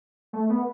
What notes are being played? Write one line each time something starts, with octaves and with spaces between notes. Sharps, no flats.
A3
B3